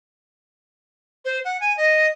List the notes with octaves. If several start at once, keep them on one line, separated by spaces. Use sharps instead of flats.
C5
F#5
G#5
D#5